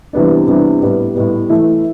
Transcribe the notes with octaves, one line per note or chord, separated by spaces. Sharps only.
C3 E3 G3 B3 D4
C3 E3 G3 B3 D4
A2 G3 B3
A2 G3 B3
E3 A3 E4